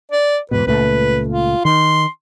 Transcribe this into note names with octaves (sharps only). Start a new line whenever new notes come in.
D5
E2 G#2 B2 B4
C#2 A#2 A3 B4
F4
D#3 C6